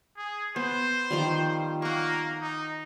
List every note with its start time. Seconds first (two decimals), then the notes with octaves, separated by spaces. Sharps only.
0.17 G#4
0.56 B3 C5
1.10 D#3 F3 G3
1.82 A#3 F#5 C#6
2.41 D#4